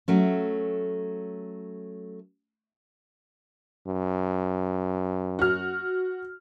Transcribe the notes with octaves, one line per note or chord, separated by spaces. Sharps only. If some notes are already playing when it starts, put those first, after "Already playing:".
F#3 A3 C#4
F#2
F#4 F6